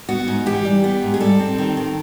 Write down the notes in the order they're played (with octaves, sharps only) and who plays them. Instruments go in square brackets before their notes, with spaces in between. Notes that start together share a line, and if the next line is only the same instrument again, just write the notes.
[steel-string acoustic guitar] B3 F#4
G#2
E3 G4
G3
B3
G#2
G#4
G3 A4
C4
D#3
D#3